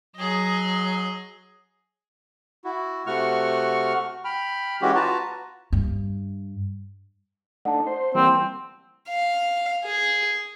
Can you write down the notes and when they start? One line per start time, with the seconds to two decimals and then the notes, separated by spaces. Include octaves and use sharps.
0.16 F#3 G#4 D#5
2.65 E4 F#4
3.07 C3 A3 F#4 F#5 C#6 F6
4.24 G5 B5 F6
4.82 E3 G#3 C#4 F#4 G4
4.95 F4 F#4 B4 A5 A#5
5.73 G2
7.65 A3 D4 D#4 F#5 A5
7.87 C5
8.15 E3 G3 A#3 C4
9.09 F5
9.84 G#4